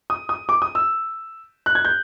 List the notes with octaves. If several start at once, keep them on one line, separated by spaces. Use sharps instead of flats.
D#6
D#6
D6
D#6
E6
F#6
G#6
G6